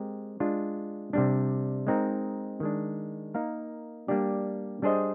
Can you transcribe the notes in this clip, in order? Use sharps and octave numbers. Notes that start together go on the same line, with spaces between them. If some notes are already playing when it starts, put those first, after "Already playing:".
Already playing: G#3 C4 G4 A#4
G#3 D4 F4
C3 G3 D4
G#3 C4 D#4 A#4
D#3 G#3 D4
A#3 D#4 A#4 F5
G3 A#3 D4 G4 D5
G3 D4 G#4 C5 D#5